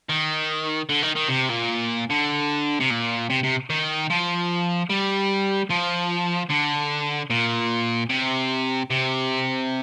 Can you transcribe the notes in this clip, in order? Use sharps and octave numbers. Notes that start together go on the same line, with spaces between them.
D#3
D3
D#3
D#3
C3
A#2
D3
C3
A#2
C3
C3
D#3
F3
G3
F3
D3
A#2
C3
C3